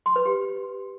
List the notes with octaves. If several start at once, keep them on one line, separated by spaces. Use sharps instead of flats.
C6
B4
G4